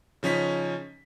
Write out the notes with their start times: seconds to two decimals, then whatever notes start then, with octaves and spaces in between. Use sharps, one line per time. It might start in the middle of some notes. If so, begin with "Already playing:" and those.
0.23 C#3 F3 C#4 D#4 B6